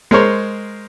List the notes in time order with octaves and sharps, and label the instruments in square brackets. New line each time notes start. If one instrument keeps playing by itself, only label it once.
[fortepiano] G#3 A#4 C5 C#5